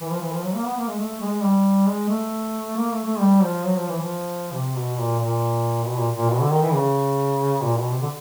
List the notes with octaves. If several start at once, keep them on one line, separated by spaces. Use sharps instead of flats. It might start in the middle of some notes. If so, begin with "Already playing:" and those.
E3
F3
E3
F3
F#3
A#3
B3
A#3
G#3
A3
G#3
G3
G#3
A3
A#3
A3
A3
G3
F3
F#3
F3
E3
F3
C3
B2
A#2
A#2
B2
A#2
A#2
B2
D3
D#3
E3
C#3
A#2
B2
C3
D3